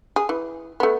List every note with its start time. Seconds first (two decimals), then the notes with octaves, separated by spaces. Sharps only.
0.16 G#4
0.29 E3
0.80 A3 B3